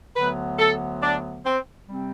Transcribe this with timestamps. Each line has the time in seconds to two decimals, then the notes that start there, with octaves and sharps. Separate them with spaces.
0.15 D2 D3 F#3 B3 B4
0.59 A4
1.03 D4
1.45 C4
1.89 C3 G3 C4